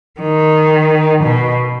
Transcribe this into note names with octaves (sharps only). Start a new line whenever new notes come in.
D#3
B2